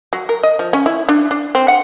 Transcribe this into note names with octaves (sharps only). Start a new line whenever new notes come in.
F#3
A#4
D#5
F3
C#4
E4
D4
D4
C4
F#5